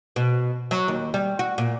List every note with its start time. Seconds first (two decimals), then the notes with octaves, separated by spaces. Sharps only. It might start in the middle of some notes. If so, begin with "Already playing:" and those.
0.16 B2
0.71 F#3
0.88 D#2
1.14 G3
1.39 F#4
1.58 A#2